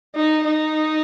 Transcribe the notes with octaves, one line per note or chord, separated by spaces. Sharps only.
D#4
D#4